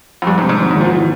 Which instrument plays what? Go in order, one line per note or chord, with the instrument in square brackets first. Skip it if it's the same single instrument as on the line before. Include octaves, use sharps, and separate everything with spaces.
[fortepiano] F2
[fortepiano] G2 [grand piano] G3
[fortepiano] G#2
[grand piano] C3
[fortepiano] G#2
[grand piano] G#1
[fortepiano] G#2
[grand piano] G#1
[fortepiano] A#2
[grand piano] E3